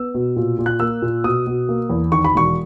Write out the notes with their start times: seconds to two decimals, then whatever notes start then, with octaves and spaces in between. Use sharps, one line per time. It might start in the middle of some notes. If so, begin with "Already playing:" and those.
Already playing: B3 E6
0.14 B2
0.36 A#2
0.59 A#2
0.66 F#6
0.80 A#3 E6
1.02 A#2
1.24 B2 D#6
1.47 B2
1.69 A#3
1.90 E2
2.12 D#3 C#6
2.24 B5
2.35 E1 C#6